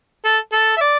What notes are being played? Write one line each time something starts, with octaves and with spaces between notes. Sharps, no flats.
A4
A4
E5
D5